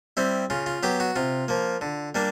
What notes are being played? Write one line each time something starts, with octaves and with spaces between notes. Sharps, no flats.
G3 C4 E4
C#3 F4
F4
F#3 B3 G4
F#4
C3 F4
F3 A#3
D3
G3 A#3 D4